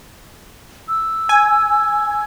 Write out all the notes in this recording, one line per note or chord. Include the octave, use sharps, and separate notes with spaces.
E6
G#5